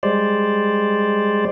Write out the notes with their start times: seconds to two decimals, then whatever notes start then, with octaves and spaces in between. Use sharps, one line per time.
0.03 G3 G#3 C5 D5